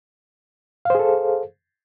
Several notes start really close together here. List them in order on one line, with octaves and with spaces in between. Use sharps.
F5 C5 G#4 A4